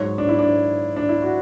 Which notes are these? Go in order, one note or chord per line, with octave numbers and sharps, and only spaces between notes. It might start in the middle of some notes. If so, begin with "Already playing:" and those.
Already playing: G#2 F#3 C#5
D4
E4
D4
D4
E4
F#4